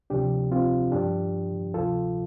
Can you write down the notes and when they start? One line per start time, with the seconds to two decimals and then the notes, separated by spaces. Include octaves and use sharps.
0.10 D2 C3 F3 D4 G4
0.51 C4 F4
0.92 G2 F3 D4 G4
1.74 D2 C3 F3 F4 A4